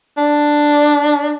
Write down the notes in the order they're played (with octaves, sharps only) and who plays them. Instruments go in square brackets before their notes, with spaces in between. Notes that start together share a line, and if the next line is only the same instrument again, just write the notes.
[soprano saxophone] D4